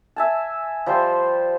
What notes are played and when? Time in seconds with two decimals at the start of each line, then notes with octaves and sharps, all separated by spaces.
0.16 E5 G#5 A5
0.86 F3 G3 C5 C6